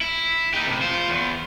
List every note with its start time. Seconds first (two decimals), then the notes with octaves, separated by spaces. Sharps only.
0.01 E4
0.54 D#4 G4
0.67 A2 C3
0.81 F4 C5
1.09 E2